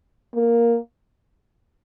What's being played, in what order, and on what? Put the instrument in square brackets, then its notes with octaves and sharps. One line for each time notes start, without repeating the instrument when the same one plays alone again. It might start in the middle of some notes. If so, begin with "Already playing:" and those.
[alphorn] A#3